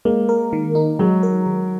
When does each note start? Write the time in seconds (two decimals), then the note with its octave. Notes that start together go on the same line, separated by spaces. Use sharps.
0.05 G#3 A#3
0.29 A#4
0.53 D#3
0.75 D#4
0.99 F#3 G#3
1.23 A#4
1.46 D#3